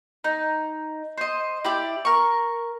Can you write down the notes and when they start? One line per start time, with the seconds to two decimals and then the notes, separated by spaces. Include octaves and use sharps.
0.24 D#4
1.17 C5 D#5
1.64 E4 G4 D5
2.05 A#4 C#6